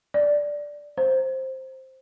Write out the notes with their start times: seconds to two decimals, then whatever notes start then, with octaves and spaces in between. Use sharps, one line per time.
0.14 D5
0.97 C5